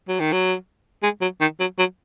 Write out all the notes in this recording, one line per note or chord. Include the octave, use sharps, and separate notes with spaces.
F#3
D#3
F#3
G#3
F#3
D#3
F#3
F#3